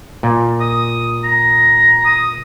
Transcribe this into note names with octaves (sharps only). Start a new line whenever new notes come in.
A#2
D#6
A#5
D#6